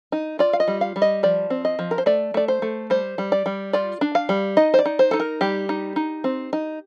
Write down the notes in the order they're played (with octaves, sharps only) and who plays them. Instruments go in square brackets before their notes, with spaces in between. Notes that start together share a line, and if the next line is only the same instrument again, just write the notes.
[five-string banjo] D#4
F4 D5
F5
D#5
G3
F5
G3
D#5
F3 D5
C4
D#5
F3
A#4
C5
A3 D5
A3 D5
C5
A3
G3 C5
G3
D5
G3
F4 D5
D4
F5
G3
D#4 D#5
C5
D5
D#4
C5
D#4 A4
A#4
G3 G4
D#4
D#4
C4
D#4